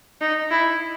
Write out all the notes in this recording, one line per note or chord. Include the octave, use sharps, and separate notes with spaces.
D#4
E4